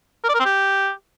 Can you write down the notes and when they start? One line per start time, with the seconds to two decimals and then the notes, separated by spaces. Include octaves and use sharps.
0.24 A#4
0.29 D5
0.34 A#4
0.40 C4
0.45 G4